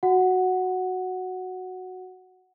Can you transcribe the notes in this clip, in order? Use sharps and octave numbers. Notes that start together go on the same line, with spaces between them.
F#4 F#5